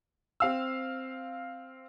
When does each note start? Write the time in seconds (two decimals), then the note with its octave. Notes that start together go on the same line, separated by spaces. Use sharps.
0.40 C4 F5 E6